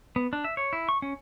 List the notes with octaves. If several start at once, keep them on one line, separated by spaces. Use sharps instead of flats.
B3
D4
E5
C#5
E4
C#6
C#4